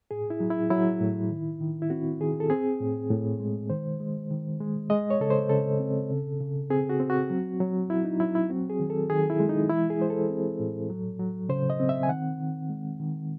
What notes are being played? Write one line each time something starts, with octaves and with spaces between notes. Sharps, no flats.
A2 G#4
E4
F#3
E4
F#3 E4
A2
D#3
D#3
E4
C4 F#4
D#3 G#4
A4
C4 G#4
A2
A2
G#3
D#3 C5
G#3
D#3
G#3
G#3 D#5
C#5
C#3 A4
C5
C#3 A4
C4
C#3
C#3
C4 G#4
F#4
C4
F#4
F#3
F#3
F#3 E4
D#4
F#3 E4
E4
C4 F#4
G#4
D#3
A4
D#3 G#4
E4
G#3
D#4
E3 E4
G#4
G#3 C5
A4
C4
A2
F#3
F#3
C#3 C5
D#5
C4
E5
G#5
D#3 F#5
D#3
G#3
D#3